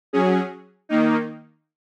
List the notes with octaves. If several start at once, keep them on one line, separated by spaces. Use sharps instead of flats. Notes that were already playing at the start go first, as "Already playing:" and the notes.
F#3 C#4 G#4
D#3 A#3 D#4